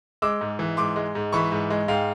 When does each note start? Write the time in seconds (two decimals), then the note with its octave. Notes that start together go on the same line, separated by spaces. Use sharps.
0.22 G#3 D6 E6
0.41 G#2
0.59 E3
0.77 G#2 C6 D6
0.96 G#3
1.15 G#2
1.32 E3 B5 C#6
1.52 G#2
1.70 G#3
1.88 G#2 F5 G5